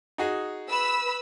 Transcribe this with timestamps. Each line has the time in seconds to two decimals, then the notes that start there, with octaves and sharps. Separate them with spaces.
0.18 D#4 F#4 G#4
0.69 B4 B5 E6